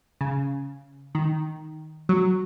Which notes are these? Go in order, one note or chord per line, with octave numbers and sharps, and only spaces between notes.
C#3
D#3
F#3